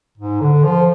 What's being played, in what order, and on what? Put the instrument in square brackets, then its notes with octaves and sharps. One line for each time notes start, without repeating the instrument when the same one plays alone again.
[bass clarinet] G#2
D3
F3